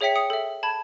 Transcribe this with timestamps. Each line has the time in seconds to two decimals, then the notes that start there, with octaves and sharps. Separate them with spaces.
0.01 G#4 C#5 E5 G5 B6 C#7
0.15 G5 D#6 C#7
0.30 A4 E5
0.63 A5 B5 G#6